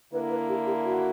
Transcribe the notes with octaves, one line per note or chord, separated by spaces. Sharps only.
D3 A#3 E4 B4
B4
G4
G4
F#4